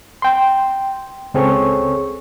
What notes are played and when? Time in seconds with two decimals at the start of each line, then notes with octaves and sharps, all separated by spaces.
0.22 G5 C6
1.34 C#2 C4 G#4 A4 C#5 C#6